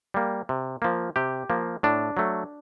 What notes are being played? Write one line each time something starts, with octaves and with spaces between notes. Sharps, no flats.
G3 A#3
C3
F3 A#3
C3 G4
F3 A#3
A2 D4
F#3 A3